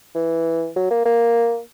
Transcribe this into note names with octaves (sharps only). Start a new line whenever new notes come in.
E3
F#3
A#3
A#3